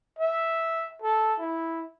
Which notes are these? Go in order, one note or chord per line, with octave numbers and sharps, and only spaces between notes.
E5
A4
E4